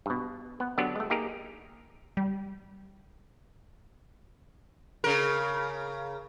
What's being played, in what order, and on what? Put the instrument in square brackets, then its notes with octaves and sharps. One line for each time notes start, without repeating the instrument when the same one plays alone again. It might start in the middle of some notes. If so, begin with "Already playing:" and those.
[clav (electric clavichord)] G2 B2
B3
D3 F#3 B3 D4 G4
G#3 A3
A#3 D#4 G4 G#4 A#4
[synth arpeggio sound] G3
[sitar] C#3 A#4